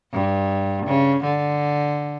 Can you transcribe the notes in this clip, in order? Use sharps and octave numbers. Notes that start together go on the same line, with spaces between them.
G2
C#3
D3